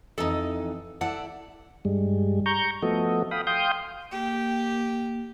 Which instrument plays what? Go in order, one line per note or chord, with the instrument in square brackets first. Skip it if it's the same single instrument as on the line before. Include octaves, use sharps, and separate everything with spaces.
[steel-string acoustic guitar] F2 E3 [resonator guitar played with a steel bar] D#4 A4
[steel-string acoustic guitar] E4 A4 D5 [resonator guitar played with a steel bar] F#5
[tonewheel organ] G2 G3 G#3
A#5 C#6 G6
F3 A3 B3 F#4 A4 D#5
F5 G5 B5 D#6
F5 G5 C6 D#6 G6
[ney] A#3 [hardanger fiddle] G4